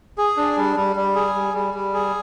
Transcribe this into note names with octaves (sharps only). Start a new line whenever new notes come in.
G#4
D4
G3
G3
G3
G#4
G3
G3
G3
G#4